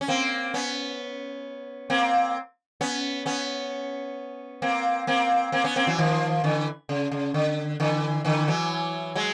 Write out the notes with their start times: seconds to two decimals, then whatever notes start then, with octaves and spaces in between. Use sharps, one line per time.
0.01 C#4
0.08 A#3 C4
0.54 B3 C#4
1.90 A#3 C4
2.81 B3 C#4
3.26 B3 C#4
4.62 A#3 C4
5.07 A#3 C4
5.52 A#3 C4
5.64 B3 C#4
5.76 A#3 C4
5.87 E3 F#3
5.99 D#3 F3
6.44 D3 E3
6.89 C#3
7.12 C#3
7.34 D3
7.80 D3 E3
8.25 D3 E3
8.48 E3 F#3
9.16 F#3 G#3